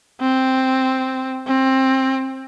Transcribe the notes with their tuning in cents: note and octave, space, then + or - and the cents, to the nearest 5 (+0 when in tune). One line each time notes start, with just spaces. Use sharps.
C4 +0
C4 +20